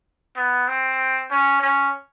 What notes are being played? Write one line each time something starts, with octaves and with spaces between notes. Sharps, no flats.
B3
C4
C#4
C#4